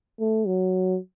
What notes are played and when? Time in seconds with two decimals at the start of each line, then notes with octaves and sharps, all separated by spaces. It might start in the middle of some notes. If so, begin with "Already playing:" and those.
0.20 A3
0.47 F#3